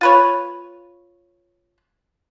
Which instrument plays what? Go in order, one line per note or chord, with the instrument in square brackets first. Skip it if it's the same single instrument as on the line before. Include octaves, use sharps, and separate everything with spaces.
[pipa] F4 B4 C#5